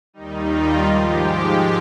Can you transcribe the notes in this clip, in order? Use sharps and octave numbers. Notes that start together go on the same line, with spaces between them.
D#2 D#3 G3 D#4
F4
G#2 F3 G#3 G4